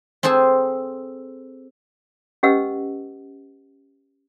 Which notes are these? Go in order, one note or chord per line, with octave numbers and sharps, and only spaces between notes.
C4 G#4 A4 C5 G#5
C#4 G4 B4 D#5 F#5 E6